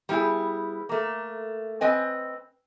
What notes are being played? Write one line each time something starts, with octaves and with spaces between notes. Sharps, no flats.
G3 B3 E4 G4 G#4
A3 A#3
C4 B4 D#5 G#5